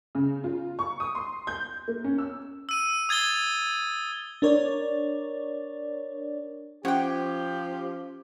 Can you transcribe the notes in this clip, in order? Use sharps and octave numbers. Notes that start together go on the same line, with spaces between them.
C#3
F4
C#6
D#6
C6
G6
A#3
C#4
E6
E6 D#7
D#6 G#6 A6 G7
D4 A#4 C#5 D5
F3 C#4 G4 F#5 G5